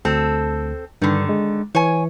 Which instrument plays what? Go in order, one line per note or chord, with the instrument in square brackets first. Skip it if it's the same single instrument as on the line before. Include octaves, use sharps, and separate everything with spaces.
[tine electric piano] D2 [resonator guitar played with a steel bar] C4 A4
[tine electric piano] G2 [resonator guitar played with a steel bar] D3 D#3
[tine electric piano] G#3
[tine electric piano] E3 [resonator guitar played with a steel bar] C#5 G#5